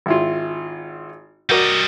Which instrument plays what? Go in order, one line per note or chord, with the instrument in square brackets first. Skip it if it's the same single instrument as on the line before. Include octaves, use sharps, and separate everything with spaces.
[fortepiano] G#1 E4 F4
[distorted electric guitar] G3 D#5 [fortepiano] F#4 A#4 D5